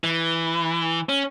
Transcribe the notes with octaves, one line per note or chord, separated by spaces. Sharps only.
E3
C#4